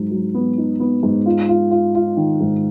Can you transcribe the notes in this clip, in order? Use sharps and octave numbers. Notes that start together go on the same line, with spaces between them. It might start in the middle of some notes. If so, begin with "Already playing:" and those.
Already playing: G#2 F#3
F#3
B3
D#4
B3
G#2
F4
F4
F4
F4
D#3
G#2